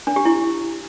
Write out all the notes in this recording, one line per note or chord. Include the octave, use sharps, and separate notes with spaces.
D4
G4
E4